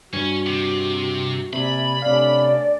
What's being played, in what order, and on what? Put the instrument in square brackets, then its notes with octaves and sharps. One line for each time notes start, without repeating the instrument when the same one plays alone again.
[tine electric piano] G2 [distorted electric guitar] C#4 [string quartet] F#4
[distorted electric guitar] C3
[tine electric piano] C3 [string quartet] A#3 D5 G#5 [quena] E5 [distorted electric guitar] B5
[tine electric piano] C3 F5 [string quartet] A3 C#4 D4 [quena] D5